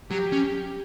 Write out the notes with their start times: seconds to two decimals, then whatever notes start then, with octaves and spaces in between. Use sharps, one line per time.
0.11 F#3 G4
0.32 C#4